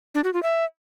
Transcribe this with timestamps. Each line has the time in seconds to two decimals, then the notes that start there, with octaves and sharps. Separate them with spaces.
0.15 D4
0.24 F#4
0.33 F4
0.43 E5